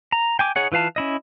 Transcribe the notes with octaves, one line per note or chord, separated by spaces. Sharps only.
A#5
G5 G#5 D6
D#4 G#4 C#5 F#5
E3 F4 B4 F5 A5
C#4 E4 D#5